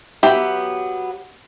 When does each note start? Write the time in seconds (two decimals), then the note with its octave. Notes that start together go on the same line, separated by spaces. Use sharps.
0.23 F#3 B3 G4 E5